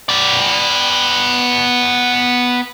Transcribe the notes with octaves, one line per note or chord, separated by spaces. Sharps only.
B3 D5